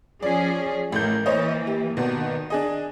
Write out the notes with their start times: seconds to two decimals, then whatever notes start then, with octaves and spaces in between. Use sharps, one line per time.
0.23 F3 C#4 G#4 D5
0.92 A1 A3 A#4 G6
1.26 E3 A#3 C5 C#5 D#5
1.67 G4
1.97 G#1 B2 D#3
2.50 D4 G#4 D#5